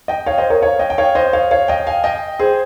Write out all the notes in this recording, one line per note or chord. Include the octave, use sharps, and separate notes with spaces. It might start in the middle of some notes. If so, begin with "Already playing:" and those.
D#5 G5
C#5 F5
C5 D#5
A#4 C#5
C#5 F5
D#5 G5
G5
C#5 F5
C5 D#5
C#5 F5
C#5 F5
D#5 G5
F5 G#5
D#5 G5
G#4 C5